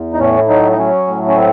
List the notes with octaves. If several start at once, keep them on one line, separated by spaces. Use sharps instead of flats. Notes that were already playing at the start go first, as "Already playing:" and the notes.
Already playing: E2
D#4
A2 C#4
F#3 D#4
D#4
F#3 C#4
A2
C#4
C4